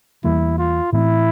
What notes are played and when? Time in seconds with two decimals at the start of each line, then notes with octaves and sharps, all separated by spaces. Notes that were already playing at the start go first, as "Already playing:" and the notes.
0.24 E2 E3 G3 A#3 E4
0.58 F4
0.93 A2 E3 A3 C4 E4